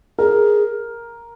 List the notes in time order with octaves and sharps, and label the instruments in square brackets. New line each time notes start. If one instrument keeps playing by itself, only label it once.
[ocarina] G#4 [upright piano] A#4